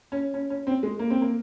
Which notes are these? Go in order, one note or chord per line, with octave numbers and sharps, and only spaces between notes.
C#4
C#4
C#4
C4
G#3
A#3
C4
A#3